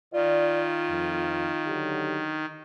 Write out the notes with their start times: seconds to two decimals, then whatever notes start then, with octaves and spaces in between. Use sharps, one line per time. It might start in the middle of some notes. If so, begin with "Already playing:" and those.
0.14 D#3 F4 D5
0.89 F2
1.65 D3 F#3 G4